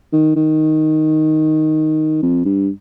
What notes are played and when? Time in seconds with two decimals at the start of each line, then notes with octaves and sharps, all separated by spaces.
0.13 D#3
0.36 D#3
2.22 F2
2.45 G2